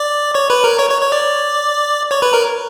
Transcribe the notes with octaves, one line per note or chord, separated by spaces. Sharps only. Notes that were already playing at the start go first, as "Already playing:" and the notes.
Already playing: D5 D6
C#5 C#6
B4 B5
A#4 A#5
C#5 C#6
C#5 C#6
C#5 C#6
D5 D6
C#5 C#6
B4 B5
A#4 A#5